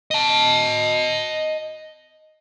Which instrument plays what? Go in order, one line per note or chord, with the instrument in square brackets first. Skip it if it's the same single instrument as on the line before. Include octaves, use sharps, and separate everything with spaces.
[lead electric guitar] D#5 A5